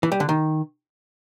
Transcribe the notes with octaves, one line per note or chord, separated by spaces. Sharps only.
E3
G3
D3
D#3